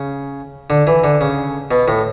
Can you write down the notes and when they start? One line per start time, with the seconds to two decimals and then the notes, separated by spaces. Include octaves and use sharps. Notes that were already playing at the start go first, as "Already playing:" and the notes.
Already playing: C#3
0.70 D3
0.87 E3
1.04 D3
1.21 C#3
1.71 B2
1.88 A2